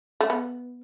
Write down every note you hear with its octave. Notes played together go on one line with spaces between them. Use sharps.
A3
B3